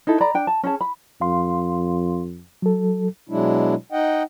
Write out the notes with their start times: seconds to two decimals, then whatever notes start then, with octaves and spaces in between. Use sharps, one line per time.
0.07 D#4 E4 A4
0.21 D5 A#5 B5
0.34 D4 G5
0.47 A5
0.63 C#4 G#4 A5
0.81 B5
1.21 F2 F5 C6
2.62 F#3 A4
3.29 B2 F#3 G#3 D4 E4
3.92 D#4 D#5 F#5 G5